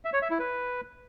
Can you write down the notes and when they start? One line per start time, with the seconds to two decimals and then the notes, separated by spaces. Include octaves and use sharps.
0.05 E5
0.13 C#5
0.22 E5
0.31 E4
0.39 B4